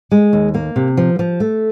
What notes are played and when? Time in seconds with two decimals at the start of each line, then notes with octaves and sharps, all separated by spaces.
0.11 G#3
0.33 D#2
0.54 A#3
0.76 C3
0.97 F3
1.19 F3
1.40 A3